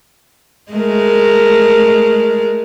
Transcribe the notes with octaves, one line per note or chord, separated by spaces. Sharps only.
G#3 A3 A#4